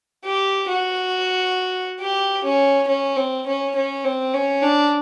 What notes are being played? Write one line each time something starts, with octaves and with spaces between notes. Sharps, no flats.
G4
F#4
G4
C#4
C#4
C4
C#4
C#4
C4
C#4
D4